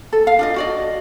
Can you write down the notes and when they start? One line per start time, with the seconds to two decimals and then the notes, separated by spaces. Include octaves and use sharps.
0.13 A4
0.27 F5
0.39 D4 F4 D#5
0.56 F#4 D5 D#5